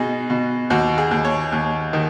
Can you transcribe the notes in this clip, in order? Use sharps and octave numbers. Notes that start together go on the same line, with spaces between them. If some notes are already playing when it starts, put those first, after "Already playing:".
Already playing: B2 D#4 F#4 G#4
B2
D#2 F#4
G#4
D#2
C#5
D#2
D#3